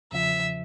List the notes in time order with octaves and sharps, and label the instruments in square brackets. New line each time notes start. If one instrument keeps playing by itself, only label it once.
[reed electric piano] E2 C#3 F3 [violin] E5